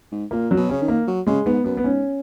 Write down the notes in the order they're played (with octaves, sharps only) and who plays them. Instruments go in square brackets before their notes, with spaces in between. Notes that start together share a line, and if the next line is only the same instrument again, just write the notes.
[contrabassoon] G#2
[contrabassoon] A#2 [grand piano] A#3
[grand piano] F#3
[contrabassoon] B2
[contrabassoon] C#3 [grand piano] C#4
[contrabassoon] D#3
[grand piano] A#3
[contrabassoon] F#3
[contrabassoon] C#3 [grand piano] G#3
[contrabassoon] G#2 [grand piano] B3
[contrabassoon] F#2 [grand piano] B3
[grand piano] B3
[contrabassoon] G#2 [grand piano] C#4